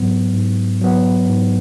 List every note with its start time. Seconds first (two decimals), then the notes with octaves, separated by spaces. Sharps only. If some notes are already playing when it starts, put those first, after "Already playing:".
Already playing: G#2 F#3 B3
0.33 G#2
0.81 F#3 B3
1.27 G#2